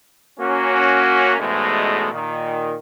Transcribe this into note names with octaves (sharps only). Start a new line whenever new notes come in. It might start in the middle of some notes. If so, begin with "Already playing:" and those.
A#3 C#4 F#4
A1 E2 G#2 B2 G#3 A3
A#2 D#3